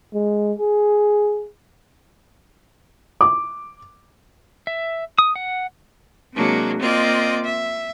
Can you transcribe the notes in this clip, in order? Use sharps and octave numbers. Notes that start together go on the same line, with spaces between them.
G#3
G#4
D6
E5
D#6
F#5
C3 F#3 G#3 A#3 D4
A#3 C4 F4 D5 D#5
E5